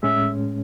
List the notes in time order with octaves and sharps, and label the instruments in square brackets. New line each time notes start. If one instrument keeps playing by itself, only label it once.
[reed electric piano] A2 G#3 C#4 [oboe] E5